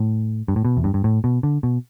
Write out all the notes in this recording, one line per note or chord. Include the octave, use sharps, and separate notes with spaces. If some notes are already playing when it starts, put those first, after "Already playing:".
Already playing: A2
G2
A2
B2
E2
G2
G2
A2
B2
D3
B2